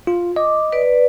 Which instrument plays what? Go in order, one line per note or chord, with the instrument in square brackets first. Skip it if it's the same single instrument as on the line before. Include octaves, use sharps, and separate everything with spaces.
[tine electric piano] F4
[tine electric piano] D#5 [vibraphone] D6
[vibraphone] B4 D5